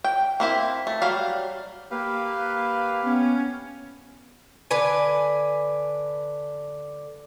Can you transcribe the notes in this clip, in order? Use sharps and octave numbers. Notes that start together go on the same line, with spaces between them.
G5
A#3 C4 E4
A3
F#3 G3 F5
A#3 G4 B4 F5
B3 C#4
D3 B4 G#5